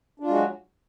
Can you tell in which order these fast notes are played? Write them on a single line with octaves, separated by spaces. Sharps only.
D4 F4 G#3 F#4 F#3